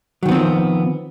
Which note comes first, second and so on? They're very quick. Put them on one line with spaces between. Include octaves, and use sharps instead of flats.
F#3 D#3 B3 C4 F3